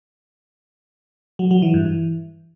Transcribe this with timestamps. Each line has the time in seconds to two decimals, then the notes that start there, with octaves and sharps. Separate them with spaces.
1.39 F#3
1.51 F#3
1.62 E3
1.74 G2
1.85 E3